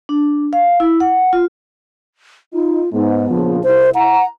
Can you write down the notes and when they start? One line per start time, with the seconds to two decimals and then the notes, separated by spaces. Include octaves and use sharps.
0.09 D4
0.53 F5
0.80 E4
1.00 F#5
1.33 F4
2.53 D#4 F4
2.93 G#2 B3
3.29 A#1 C#3 F3
3.64 C2 E4 C5
3.95 E4 F#5 A#5